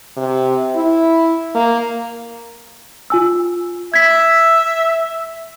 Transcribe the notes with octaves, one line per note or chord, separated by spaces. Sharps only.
C3
E4
A#3
F4 G#5 E6
E5 G#6 B6